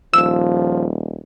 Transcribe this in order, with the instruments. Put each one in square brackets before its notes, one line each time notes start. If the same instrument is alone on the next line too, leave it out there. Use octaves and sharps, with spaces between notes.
[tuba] D#1 [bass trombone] F3 [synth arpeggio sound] E6